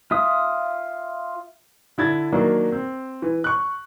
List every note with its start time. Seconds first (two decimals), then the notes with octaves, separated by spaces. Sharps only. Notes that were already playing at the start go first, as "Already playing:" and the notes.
0.11 F4 E5 D#6
1.98 D3 E4 G#6 A6
2.32 D#3 F#3 A#3 D4
2.72 C4
3.22 E3
3.44 C#6 F#6